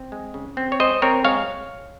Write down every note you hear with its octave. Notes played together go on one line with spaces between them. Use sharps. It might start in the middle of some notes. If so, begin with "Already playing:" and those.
Already playing: C4
G#3
C#3
C4
C#5
G#3 C5 D#5
C4 A#4 C#5
G#3 C#5 F5